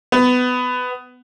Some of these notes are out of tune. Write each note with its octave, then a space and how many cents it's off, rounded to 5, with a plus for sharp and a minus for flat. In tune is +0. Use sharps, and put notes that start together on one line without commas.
B3 +20